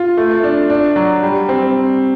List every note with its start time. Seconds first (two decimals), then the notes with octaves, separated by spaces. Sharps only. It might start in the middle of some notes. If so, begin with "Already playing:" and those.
Already playing: F4
0.17 A3
0.44 D4
0.70 D4
0.96 F#3
1.23 G3
1.49 C4